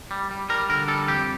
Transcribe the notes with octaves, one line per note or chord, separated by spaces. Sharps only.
G3
G3
G3 A#4
D3 A#4
G3 A4
F2 G4